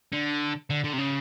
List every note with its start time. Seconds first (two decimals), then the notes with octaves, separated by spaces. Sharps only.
0.13 D3
0.70 D3
0.84 D3
0.93 C3
0.98 C#3